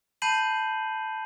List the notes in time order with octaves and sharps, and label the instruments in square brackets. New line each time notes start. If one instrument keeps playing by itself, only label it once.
[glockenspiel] A5 B5 G6 C7 D#7 F#7